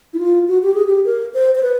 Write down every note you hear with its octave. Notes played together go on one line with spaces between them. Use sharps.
E4
F4
F#4
G4
G#4
G4
A#4
C5
C5
B4